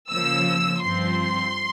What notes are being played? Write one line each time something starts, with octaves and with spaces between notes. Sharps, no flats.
C#3 F3 A#3 E6
G2 F3 C4 C6